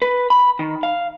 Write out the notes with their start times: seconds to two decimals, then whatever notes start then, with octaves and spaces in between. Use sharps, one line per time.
0.02 B4
0.30 B5
0.59 D#3
0.83 F5